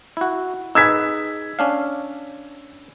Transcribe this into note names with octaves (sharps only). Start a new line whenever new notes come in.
E4 F#4
D#4 G#4 B4 E6 G#6 B6
C#4 D4 F5